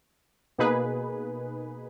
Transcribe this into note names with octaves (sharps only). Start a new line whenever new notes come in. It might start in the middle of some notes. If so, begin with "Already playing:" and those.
B2 A#3 D#4 G#4 B4